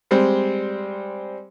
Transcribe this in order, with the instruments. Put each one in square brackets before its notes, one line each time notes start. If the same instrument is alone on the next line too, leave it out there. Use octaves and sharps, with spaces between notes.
[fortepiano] G3 G#3 C4